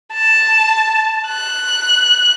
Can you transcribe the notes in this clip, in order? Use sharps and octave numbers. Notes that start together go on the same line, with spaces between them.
A5
F#6